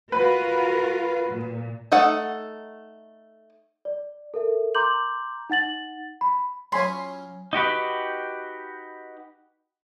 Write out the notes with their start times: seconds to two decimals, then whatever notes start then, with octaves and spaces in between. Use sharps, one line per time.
0.12 F4 F#4 A#4 B4
1.30 A#2
1.92 A3 D#4 A4 F#5
3.85 D5
4.34 A4 A#4 E5
4.75 A#5 C6 D6 G6 F#7
5.50 D#4 F#5 A6 F#7
6.21 B5
6.72 F#3 C#4 F4 C#5 G#5 B5 C6
7.53 D#4 F#4 G4 B4